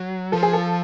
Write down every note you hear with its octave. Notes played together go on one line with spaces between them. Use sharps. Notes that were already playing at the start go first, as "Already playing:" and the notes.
Already playing: F#3
F3 A4
G#4
A4